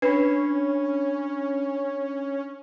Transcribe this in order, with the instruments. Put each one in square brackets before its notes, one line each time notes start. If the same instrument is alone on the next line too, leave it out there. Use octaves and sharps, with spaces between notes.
[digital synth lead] C#4 [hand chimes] D4 B5 [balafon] B4